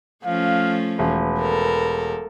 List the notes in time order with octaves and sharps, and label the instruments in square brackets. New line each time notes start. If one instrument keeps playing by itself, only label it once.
[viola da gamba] F3 A3 C#4 [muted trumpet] F5
[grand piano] E1 [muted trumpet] B4
[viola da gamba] A4 A#4